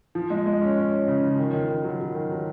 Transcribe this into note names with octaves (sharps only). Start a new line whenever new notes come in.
F3
G#3
G#3
C#4
C#4
C#4
C#3
F3
D#3
D#3
D#3
F#3
F#3
D#3
F#3